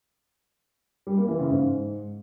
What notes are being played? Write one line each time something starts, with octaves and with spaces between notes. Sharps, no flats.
G3
A#3
E3
C#3
G#2